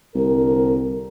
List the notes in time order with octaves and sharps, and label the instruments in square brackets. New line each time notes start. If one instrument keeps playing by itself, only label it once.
[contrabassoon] C2 [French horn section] D3 C4 A#4